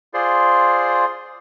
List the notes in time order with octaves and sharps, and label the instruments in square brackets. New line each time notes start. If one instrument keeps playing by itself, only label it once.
[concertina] F4 G#4 C5 D5 C6